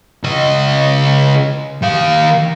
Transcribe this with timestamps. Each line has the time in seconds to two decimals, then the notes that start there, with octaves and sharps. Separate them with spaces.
0.24 C#2 D#5
1.83 D#3 F5